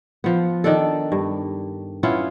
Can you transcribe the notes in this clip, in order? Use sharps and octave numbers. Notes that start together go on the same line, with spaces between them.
F3 B3
D#3 D4 A4
G2
B3 C#4 E4 F4